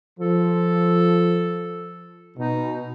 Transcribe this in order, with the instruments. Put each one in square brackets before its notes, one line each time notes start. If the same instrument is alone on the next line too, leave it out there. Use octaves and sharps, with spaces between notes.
[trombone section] F3 [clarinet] A4
[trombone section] B2 [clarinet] D#4